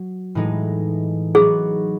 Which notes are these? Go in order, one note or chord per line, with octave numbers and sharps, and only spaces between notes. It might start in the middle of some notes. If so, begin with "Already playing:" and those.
Already playing: F#3
A2 E3 G#3 D#4
F#3 B3 D#4 F#4 G#4